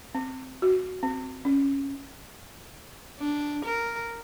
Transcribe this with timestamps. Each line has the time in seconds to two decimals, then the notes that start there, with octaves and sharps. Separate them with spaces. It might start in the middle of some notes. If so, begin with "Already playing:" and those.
0.15 C4
0.62 F#4
1.03 C4
1.45 C#4
3.20 D4
3.65 A#4